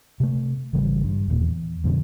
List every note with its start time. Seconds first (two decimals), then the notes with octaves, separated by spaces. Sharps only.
0.20 C3 A3
0.73 G#1 C#3 E3 G3
1.04 G2
1.28 D#1 D#2 A#2
1.40 E2
1.84 F2 B2 D3